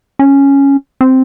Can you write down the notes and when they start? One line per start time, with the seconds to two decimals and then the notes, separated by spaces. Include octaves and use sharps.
0.19 C#4
1.01 C4